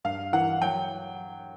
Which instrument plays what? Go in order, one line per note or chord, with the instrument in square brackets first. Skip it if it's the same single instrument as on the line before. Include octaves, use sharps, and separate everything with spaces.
[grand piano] G2 F5
E3 F#5
F#3 G5